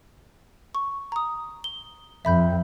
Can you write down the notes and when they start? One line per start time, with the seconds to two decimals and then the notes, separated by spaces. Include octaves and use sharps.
0.75 C#6
1.12 A#5 D#6
1.64 G7
2.25 F2 E5 B5 G6